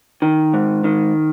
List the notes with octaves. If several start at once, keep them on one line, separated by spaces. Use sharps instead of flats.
D#3
G#2
D#3